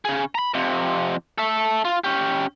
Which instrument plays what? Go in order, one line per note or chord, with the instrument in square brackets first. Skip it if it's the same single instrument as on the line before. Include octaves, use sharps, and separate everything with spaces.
[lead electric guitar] C#3 G#4
A#5 B5
F2 C3
A4 E5
F4
C#4 G4